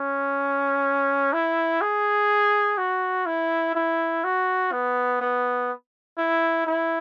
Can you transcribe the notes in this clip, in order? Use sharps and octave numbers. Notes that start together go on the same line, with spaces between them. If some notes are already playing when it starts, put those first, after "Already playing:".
Already playing: C#4
E4
G#4
F#4
E4
E4
F#4
B3
B3
E4
E4